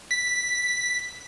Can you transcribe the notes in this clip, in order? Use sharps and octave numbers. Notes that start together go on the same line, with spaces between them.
B6